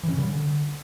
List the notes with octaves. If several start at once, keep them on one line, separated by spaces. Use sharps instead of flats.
E3
C#4
C#3
G3
D3